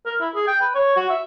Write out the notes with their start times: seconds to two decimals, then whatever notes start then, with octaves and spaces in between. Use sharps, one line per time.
0.06 A#4
0.20 E4
0.35 G#4
0.47 G5
0.61 B4
0.75 C#5
0.96 F#4
1.10 E5